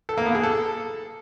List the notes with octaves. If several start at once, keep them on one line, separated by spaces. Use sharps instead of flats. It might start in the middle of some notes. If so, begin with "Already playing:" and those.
A4
A#3
B3
G#4
A4